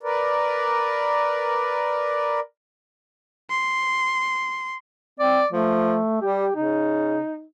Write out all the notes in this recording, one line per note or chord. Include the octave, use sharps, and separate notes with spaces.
A#4 B4 D5
C6
C4 D5
F3 A3
G3 G4
C#3 D#4